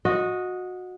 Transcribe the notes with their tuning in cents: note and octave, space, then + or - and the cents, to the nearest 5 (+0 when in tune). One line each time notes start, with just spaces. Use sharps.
F#4 -20 D#5 +0